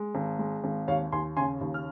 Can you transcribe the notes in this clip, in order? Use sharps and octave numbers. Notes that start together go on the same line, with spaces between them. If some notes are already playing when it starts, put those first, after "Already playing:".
Already playing: G#3
G#1
G#3
G#1
D#2 C#5 F5
D#2 G#5 C6
C#3 G#5 C6
D#2
F6